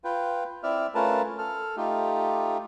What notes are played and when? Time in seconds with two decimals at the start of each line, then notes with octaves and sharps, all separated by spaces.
0.04 F4 B4 G5
0.63 C4 E4 D5 E5 F6
0.95 A3 C#4 F4 A#4 B4 A5
1.38 A4 F6
1.77 A3 D#4 F4 G4